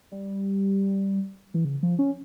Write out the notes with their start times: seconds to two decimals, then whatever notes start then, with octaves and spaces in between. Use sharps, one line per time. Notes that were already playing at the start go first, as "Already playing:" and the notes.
0.12 G3
1.54 E3
1.65 C#3
1.83 F3
1.99 C#4